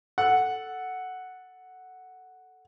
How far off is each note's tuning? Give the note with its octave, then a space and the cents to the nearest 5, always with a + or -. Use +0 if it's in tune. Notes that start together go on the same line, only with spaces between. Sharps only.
A4 +0 F#5 +0